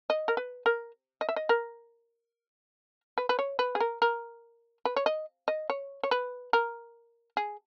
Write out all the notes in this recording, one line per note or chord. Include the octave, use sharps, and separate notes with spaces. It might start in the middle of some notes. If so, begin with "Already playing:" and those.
D#5
A#4
B4
A#4
D#5
E5
D#5
A#4
B4
B4
C#5
B4
G#4
A#4
A#4
B4
C#5
D#5
D#5
C#5
C#5
B4
A#4
G#4